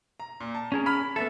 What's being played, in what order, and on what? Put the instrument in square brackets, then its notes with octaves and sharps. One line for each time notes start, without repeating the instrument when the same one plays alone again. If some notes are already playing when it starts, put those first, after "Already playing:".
[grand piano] A#5
A#2
A5
[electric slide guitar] C#4 G#4 A#4
[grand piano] B5 F6 B6
[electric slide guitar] B3 C#4 A4 [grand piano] E5